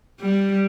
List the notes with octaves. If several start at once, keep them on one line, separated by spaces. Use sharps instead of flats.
G3